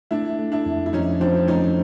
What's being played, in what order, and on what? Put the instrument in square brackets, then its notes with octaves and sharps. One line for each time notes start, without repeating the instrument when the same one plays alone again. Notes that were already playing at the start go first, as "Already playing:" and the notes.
[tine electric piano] A3 [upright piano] D4 E4
[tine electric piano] A3
[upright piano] D4 E4
[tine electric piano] F2
[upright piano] E4
[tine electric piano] F3 [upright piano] C#4 D#4
[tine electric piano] F3 [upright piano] C4 D4
[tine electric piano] A3 [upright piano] C#4 D#4